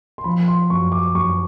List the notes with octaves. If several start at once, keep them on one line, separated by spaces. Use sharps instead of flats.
C6
F3 B5
C6
F#2 C#6
D6
F#2 C#6